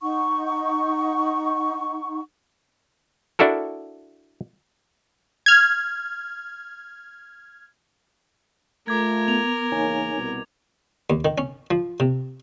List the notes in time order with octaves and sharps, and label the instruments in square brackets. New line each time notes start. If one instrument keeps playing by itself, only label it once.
[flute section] D#4 F#5 C#6
[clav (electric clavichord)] D4 E4 F#4 A4 A#4
[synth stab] F6 G#6
[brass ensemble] A3 F4 [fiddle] A#4 [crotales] D6 G#6
[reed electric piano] B3 [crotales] F7
[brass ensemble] E2 C#3 A#3 [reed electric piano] D#4 C#5 G#5
[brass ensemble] C2 B2
[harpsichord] D#2
D#3
C#4
F3
C3